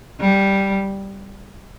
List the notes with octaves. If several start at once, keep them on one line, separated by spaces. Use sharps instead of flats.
G3